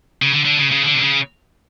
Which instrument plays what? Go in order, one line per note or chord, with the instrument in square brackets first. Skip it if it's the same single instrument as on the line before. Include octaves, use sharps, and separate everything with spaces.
[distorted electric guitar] C#3
D3
D3
C#3
C#3
D3
C3
C#3